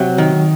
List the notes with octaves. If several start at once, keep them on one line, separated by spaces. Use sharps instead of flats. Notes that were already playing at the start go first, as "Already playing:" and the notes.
Already playing: C3 F#3
D#3